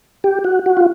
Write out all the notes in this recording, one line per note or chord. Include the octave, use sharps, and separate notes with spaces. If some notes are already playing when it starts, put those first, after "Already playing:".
G4
F#4
F#4
F4